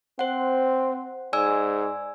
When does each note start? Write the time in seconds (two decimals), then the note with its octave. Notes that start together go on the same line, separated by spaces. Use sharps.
0.19 C4 C5 F#5
1.33 G#2 D5 G#5 E6